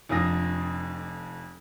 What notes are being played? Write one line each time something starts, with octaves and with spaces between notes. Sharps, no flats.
F1 F2 D4 F4 D#6 A#6